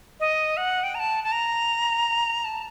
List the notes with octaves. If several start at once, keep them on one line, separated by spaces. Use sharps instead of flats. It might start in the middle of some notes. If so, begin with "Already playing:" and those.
D#5
F#5
G5
A#5
A5
A5
A#5
A5